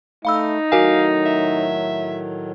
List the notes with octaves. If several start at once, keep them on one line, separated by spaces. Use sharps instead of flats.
A3 D#4 F5 B5 E6
A2 D#3 F#3 F#4 A#4 F5 G#5
E5